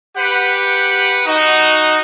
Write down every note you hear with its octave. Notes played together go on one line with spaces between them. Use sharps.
G4 B4 F#5
D#4 F#4